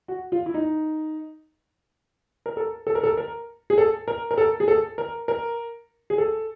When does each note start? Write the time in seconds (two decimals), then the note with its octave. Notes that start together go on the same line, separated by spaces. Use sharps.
0.08 F#4
0.32 F4
0.46 E4
0.54 D#4
2.46 A#4
2.57 A4
2.87 A4
2.95 A#4
3.03 A4
3.17 A#4
3.70 G#4
3.78 A4
4.08 A#4
4.31 A#4
4.38 A4
4.60 G#4
4.68 A4
4.98 A#4
5.28 A#4
6.10 G#4
6.18 A4